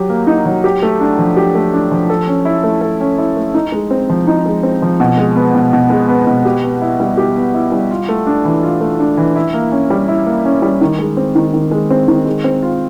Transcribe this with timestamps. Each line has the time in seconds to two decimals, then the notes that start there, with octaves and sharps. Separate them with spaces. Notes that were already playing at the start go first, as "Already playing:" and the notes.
Already playing: F#3 G4
0.09 A#3
0.27 D#4
0.46 F#3
0.64 G4
0.82 A3
1.00 D4
1.19 F3
1.37 G4
1.55 A3
1.74 D4
1.91 F3
2.10 A4
2.27 C#4
2.45 E4
2.64 A3
2.81 A4
3.01 C#4
3.18 E4
3.37 A3
3.54 D#4
3.72 G#3
3.91 C4
4.09 F3
4.27 D#4
4.46 G#3
4.63 C4
4.82 F3
5.00 B2
5.17 G#3
5.36 B3
5.55 B2
5.73 B2
5.90 G#3
6.08 B3
6.27 B2
6.45 G4
6.63 B3
6.81 E4
7.00 G3
7.18 G4
7.36 B3
7.54 E4
7.72 G3
7.91 F4
8.09 A3
8.27 D4
8.45 E3
8.63 F4
8.81 A3
9.00 D4
9.17 E3
9.36 E4
9.54 A#3
9.72 C#4
9.90 G3
10.08 E4
10.26 A#3
10.45 C#4
10.62 G3
10.81 D#3
10.99 G#3
11.17 C4
11.35 D#3
11.53 D#3
11.71 G#3
11.90 C4
12.08 D#3
12.26 G#3
12.44 C4
12.62 F4